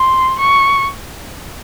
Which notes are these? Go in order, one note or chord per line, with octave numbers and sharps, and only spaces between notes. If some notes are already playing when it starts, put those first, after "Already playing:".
Already playing: C6
C#6